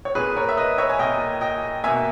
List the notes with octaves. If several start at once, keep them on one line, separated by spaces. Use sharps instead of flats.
C#5
A#2 A#3 G#4 B4
A#4 C#5
E5
B4 D#5
C#5 E5
G#5
A#2 A#3 D#5 G5
D#5 G5
B2 A#3 E5 G#5